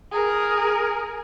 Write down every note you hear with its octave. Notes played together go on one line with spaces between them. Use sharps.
G#4 A#4